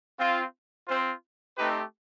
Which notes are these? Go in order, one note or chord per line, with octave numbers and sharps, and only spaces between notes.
C4 F4
C4 F4 C5
A3 C4 D#4 G4 B4